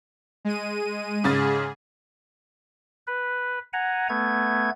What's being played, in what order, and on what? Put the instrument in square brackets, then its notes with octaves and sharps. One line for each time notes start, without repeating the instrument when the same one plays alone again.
[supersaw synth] G#3 D#7
[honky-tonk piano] G#2 C#3 A6 [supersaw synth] G#4
[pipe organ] B4
F#5 G#5 A#5
A3 B3 G#6